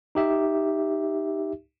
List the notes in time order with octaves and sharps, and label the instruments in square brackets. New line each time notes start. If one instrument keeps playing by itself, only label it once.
[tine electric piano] D#4 G4 E5